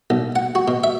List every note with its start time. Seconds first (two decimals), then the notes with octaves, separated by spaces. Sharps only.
0.10 B1
0.36 F#5
0.55 F#4
0.68 B2
0.84 E5